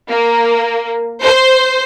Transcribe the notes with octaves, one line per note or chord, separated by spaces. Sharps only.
A#3
C5